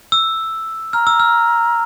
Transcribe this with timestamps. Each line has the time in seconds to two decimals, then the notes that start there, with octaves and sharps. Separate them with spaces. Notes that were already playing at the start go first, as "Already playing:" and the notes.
0.12 E6
0.93 A#5 F6
1.07 E6
1.20 F6